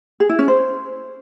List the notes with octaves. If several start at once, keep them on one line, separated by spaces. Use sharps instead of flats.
G#4
E4
C#4
C5